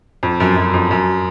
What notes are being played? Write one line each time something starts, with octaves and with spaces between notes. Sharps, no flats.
F2
F#2
F#2
F2
F#2